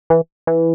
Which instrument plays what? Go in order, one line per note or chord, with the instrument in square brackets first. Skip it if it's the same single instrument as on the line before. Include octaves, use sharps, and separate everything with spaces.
[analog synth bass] E3
E3